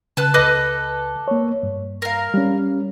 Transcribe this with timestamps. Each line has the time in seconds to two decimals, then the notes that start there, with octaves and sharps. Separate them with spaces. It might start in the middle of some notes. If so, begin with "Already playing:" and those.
0.17 C#3 B4 A5 F#6
0.34 C#2 A4 B4 D#5 D6
1.28 A#3 C#5
1.63 G2
2.02 A#4 F5
2.34 G3 C#4